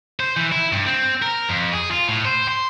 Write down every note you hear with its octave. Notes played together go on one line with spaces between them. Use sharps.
C5
E3
E4
G2
C4
A#4
F2
G#4
F4
A2
C5
C6